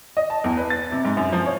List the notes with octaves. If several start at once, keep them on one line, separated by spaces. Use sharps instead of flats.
D#5
A5
E2
B4
A6
C3
G#2
F#2
F3
C#5